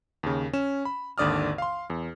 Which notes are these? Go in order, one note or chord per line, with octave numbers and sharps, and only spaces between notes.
D#2 C#3
C#4 E7
B5
G#1 D#2 D3 D5 D#6 F6
F5 C6
E2